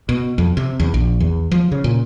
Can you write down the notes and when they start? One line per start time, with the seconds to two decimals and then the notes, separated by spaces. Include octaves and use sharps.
0.09 B2
0.38 F2
0.57 C3
0.80 E2
0.94 A#1
1.20 E2
1.52 F3
1.72 C#3
1.84 A#2